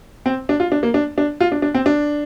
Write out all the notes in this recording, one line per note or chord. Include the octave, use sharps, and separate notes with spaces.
C4
D4
F4
D4
A#3
D4
D4
F4
D4
D4
C4
D4